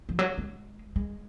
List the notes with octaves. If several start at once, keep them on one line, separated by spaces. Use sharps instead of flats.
F3
F#3
G#3
G#3